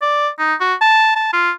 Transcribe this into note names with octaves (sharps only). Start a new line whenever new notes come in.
D5
D#4
F#4
A5
A5
F4